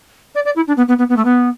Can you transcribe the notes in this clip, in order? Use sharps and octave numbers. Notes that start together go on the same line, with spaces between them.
D5
D5
E4
D4
B3
B3
B3
B3
A3
B3